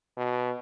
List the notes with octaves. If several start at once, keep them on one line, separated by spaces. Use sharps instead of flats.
B2